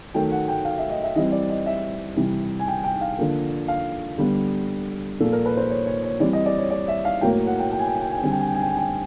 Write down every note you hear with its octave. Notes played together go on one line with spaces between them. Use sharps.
D#3 F#3 A3 G5
F#5
G5
F5
E5
D#5
E5
E3 G3 C4 D#5
D5
D#5
E5
C3 E3 G3
G#5
G5
G5
F5
D3 F3 A#3
F5
D3 G3 B3
A#2 F3 A#3 A4
A#4
B4
C5
C#5
C#5
C#5
E3 G3 C4 D5
D#5
D5
C#5
D5
E5
F5
A2 F#3 A#3 G5
F#5
G5
G5
G#5
G5
G#5
G5
G#5
G5
D3 G3 C4 G#5
G5
G#5
G5
G#5
G5
G#5
G5